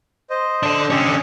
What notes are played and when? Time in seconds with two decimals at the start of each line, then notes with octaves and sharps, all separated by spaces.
0.30 C5 D#5
0.63 D4 A4
0.90 D3 C#4 G4 D#5